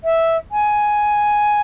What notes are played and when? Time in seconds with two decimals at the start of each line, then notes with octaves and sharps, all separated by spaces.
0.04 E5
0.51 G#5